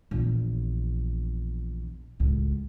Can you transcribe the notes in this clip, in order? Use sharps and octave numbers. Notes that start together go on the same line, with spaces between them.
A#1 E2
C#2 A2